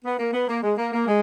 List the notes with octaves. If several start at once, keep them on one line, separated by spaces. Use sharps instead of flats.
B3
A#3
B3
A#3
G#3
A#3
A#3
G#3